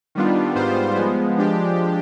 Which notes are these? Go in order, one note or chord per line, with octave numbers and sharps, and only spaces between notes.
D#3 G3 B3 D4 F4
G#2 G3 B3 F4 C5
F3 G#3 B3
F3 G#3 D4 G4